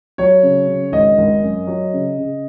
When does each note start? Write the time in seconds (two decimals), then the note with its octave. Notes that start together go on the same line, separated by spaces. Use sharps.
0.18 F#3 C#5
0.43 C#3
0.68 C#3
0.92 G#1 D#5
1.18 G#1
1.43 F#2
1.67 F#3
1.93 C#3
2.18 C#3